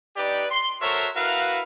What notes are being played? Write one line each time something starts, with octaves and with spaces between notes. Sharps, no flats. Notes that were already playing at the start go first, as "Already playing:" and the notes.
D#4 G4 B4 D5
C6
F#4 A4 A#4 C5 C#5 E5
E4 F#4 A#4 B4 F5